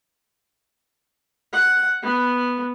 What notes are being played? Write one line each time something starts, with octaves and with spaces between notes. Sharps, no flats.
F#5
B3